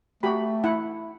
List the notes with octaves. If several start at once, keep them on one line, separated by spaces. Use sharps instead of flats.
A3 F#4 G4 B5
E4 F#5